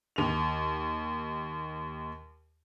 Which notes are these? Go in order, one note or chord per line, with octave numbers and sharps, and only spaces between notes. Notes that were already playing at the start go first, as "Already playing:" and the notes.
D#2 F7